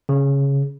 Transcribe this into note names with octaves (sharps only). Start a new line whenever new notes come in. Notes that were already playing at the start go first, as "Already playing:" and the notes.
C#3